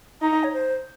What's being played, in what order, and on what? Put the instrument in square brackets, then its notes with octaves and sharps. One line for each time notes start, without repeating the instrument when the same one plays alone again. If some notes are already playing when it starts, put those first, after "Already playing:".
[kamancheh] D#4 [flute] A#5
[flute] C#5
C5